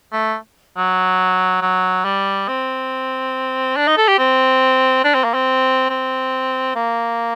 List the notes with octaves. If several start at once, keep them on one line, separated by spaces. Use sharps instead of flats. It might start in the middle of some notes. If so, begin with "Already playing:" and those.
A3
F#3
F#3
G3
C4
D4
D#4
A4
G4
C4
D4
C4
A#3
C4
C4
A#3